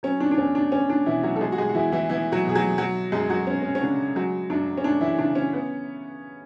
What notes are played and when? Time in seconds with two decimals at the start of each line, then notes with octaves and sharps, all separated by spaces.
0.03 F#3 C#4
0.20 D4
0.31 D4
0.37 E2 C#4
0.55 D4
0.72 E2 C#4
0.90 D4
1.06 B2 E3 E4
1.23 F#3 F#4
1.36 A4
1.40 F#3 G#3 G#4
1.52 F#4
1.58 G#3 G#4
1.69 F#4
1.75 E2 E3 E4
1.92 E3 E4
2.09 E3 B3 E4
2.32 F#3 F#4
2.44 B2 G#4
2.55 F#3 F#4
2.78 F#3 F#4
3.12 F#2 G#3 G#4
3.30 F#3 F#4
3.47 B3 C#4
3.62 C#4
3.75 C#4
3.81 C#3 D4
4.16 F#3 G#3 F#4
4.50 F#2 D4
4.77 C#4
4.84 F#2 D4
5.01 E3 E4
5.18 C#3 D4
5.35 C#4
5.53 B3